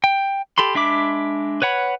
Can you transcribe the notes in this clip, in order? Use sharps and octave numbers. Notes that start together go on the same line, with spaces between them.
G5
G4 A4 B5 C6
G#3 D4 E5 B5 D6
B4 C#5 F#5 B5